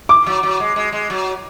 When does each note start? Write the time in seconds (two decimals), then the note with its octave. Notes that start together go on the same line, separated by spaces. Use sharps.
0.09 D6
0.26 F#3
0.43 F#3
0.60 G#3
0.76 G#3
0.92 G#3
1.10 F#3